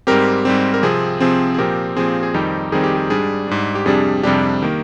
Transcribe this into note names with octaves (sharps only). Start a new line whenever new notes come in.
G#2 G3 C4 G4 A#4
G#2 G3 C4
A#4
C3 F3 C4 G#4
C3 F3 C4 G#4
G#4
A#2 F3 C4 G4 A#4
A#2 F3 C4 G#4
G#4
F2 D#3 G3 C4 D#4 G4
F2 D#3 G3 C4 D#4 G#4
G4
G#4
G#2 G3 D4 G#4
G#2 G3 D4
G4
F2 C3 G3 D4 G#4
F2 C3 G3 D4 G4
D#3 A#3